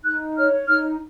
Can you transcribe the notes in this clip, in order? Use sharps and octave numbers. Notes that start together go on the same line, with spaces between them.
D#4 F#6
C#5 F6
D#4 F6